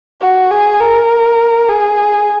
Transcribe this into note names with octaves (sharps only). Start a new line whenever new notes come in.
F#4
G#4
A#4
G#4